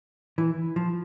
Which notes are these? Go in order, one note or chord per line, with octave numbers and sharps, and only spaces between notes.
E3
F3